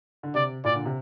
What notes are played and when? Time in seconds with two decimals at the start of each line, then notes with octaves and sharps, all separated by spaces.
0.23 D3
0.34 C3 D5
0.64 A#2 D5
0.75 D3
0.86 C3